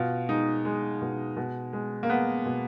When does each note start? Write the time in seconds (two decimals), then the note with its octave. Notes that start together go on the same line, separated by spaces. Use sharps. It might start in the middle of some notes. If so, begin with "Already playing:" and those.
Already playing: B2 F4
0.29 G#3 D#4
0.65 G#3
1.01 B2
1.37 B2
1.73 G#3
2.03 A#3
2.10 G#3 B3
2.46 B2